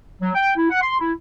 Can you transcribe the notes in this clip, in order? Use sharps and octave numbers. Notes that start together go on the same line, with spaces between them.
F#3
G5
E4
F#5
C6
E4